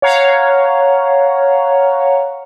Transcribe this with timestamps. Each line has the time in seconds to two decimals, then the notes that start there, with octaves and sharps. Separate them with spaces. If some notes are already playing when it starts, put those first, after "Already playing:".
0.02 C#5 F5 F#5 A#5